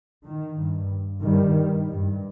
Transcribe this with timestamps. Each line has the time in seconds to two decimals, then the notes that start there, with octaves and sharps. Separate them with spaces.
0.24 D#3
0.57 G2
1.23 G2 D#3 G3
1.90 G2